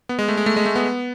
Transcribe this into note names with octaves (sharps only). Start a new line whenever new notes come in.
B3
G#3
A3
G#3
A3
G#3
A3
B3